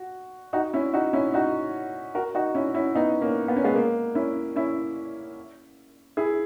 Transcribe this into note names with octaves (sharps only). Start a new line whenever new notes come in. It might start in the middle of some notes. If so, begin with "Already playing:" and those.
Already playing: F#4
D#4 F#4
C#4 E4
D#4 F#4
C#4 E4
D#4 F#4
F#4 A#4
D#4 F#4
C#4 E4
C#4 E4
B3 D#4
A#3 C#4
B3
C#4
G#3 B3
A#3
C#4 E4
C#4 E4
E4 G#4